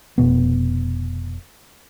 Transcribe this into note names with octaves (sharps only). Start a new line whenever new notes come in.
F1 B2 B3